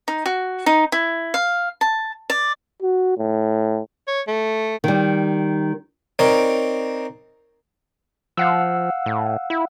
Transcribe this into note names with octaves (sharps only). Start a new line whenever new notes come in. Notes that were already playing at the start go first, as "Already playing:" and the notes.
D#4
F#4
D#4
E4
F5
A5
D5
F#4
A2
C#5
A3
D#3 G3
C4 D#4 A#4 C#5 D5
F3 F5 F#5 E6
A2
E4